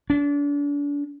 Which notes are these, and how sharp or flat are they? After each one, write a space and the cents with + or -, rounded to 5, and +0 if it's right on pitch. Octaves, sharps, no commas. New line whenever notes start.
D4 -35